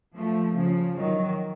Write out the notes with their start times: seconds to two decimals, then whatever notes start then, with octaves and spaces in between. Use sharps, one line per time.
0.16 F3 A3
0.56 C#3 F3
0.97 D#3 F#3